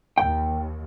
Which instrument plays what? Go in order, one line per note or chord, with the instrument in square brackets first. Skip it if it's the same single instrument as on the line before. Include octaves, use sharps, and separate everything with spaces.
[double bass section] D#2 [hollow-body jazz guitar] G5